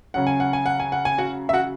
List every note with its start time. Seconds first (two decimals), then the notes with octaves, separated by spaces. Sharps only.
0.14 C#3 F#3 C#4 F#5
0.27 G#5
0.40 F#5
0.53 G#5
0.66 F#5
0.80 G#5
0.92 F#5
1.05 G#5
1.18 F#4 F#5
1.49 E5
1.53 F#4 F#5